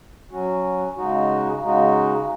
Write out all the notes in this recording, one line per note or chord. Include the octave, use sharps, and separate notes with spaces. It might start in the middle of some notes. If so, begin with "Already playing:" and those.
F#3 C#4 F#4
C#3 G#3 D#4 F#4
C#3 G#3 D#4 F#4